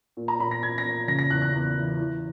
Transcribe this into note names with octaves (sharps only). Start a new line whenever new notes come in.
A#2
A#5
A#2 B5
A#6
A#2 G#6
A#6
A#2
C#3 A#6
A#6
E2 F#6
F#6
E2
E3
E3